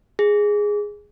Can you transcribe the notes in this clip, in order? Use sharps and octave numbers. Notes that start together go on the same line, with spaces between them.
G#4